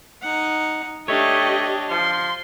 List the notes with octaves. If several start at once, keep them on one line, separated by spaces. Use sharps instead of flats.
D#4 F#5
A3 D4 G4 C#5 D#5
F3 C6